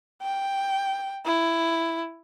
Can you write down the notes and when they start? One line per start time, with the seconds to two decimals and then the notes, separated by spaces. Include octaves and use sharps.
0.22 G5
1.26 E4